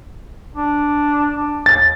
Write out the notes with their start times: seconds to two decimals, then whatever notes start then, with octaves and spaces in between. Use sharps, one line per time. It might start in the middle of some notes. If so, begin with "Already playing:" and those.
0.55 D4
1.36 D4
1.66 D#2 A6